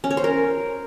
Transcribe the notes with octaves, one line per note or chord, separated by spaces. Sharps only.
C#4
C#5
C5
A#4